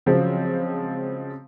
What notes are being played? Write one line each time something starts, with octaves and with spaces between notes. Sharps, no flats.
C#3 F3 F#3 G#3 C4